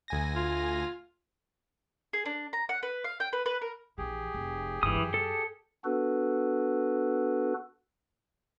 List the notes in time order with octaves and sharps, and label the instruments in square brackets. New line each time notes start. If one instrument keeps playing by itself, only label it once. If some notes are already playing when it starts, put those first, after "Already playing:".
[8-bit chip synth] D2 G#5 A#6
[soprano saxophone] F4
[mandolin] G#4
D4
A#5
F#5
B4
F5
G5
B4
B4
A#4
[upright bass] A#1 E3 [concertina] G4 G#4
[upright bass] F1
[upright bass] G1 [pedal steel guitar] E3 D#6
[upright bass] F#2
[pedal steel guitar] A4
[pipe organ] B3 D4 F#4 A4 B4